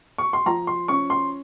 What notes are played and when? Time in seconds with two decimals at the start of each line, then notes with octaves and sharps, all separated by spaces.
0.18 C#6
0.33 C6
0.46 F3 A#5
0.67 C6
0.88 C#4 C#6
1.10 C6